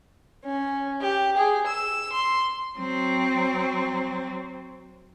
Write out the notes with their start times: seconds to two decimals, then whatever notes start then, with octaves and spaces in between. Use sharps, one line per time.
0.44 C#4
1.02 G4
1.37 G#4
1.68 E6
2.13 C6
2.79 F#3 C4